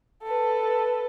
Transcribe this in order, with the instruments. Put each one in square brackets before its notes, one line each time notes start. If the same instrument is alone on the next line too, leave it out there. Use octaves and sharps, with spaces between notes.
[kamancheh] A4 B4